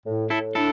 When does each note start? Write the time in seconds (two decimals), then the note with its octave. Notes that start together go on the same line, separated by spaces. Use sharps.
0.05 A2
0.30 A2 E4 A4
0.55 D4 E4 A4